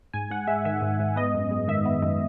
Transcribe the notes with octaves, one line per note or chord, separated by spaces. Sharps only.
G#2 G#5
G#2 F#5
G#3 E5
D#3 E5
G#2
G#2
B3 D#5
F#2
G#3
D#3 E5
B3
F#2